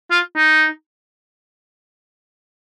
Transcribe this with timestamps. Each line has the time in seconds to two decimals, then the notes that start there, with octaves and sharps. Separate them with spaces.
0.11 F4
0.36 D#4